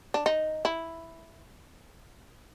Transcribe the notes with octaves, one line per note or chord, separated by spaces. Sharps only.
D4
D#4
E4